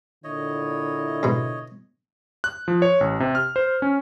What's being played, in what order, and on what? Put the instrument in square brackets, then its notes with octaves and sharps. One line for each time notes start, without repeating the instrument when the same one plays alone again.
[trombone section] A#2 E4 [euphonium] D3 [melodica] C#5 D#5
[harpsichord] G#2 B2
[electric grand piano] F#6
F3
C#5
A1
C3
F6
C5
C#4